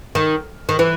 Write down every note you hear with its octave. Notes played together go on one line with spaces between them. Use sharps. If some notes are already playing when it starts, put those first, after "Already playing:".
D#3
D#3
E3